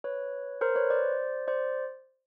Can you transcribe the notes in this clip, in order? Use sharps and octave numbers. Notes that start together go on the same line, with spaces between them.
B4 C#5
A#4 C5
B4 C#5
C5 D5
C5 D5